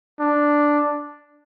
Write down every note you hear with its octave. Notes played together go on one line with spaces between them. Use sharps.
D4